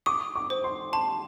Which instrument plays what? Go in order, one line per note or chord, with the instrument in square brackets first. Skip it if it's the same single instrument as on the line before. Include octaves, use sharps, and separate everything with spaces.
[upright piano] D6 [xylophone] D#6
[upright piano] D6
[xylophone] C5
[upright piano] C6
[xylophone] A5 [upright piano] C6